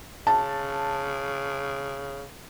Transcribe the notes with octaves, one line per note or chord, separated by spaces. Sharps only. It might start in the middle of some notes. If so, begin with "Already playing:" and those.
C#3 A5